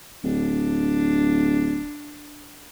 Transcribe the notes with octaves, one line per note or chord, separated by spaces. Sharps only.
D1 D4